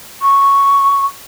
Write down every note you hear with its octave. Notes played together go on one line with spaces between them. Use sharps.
C#6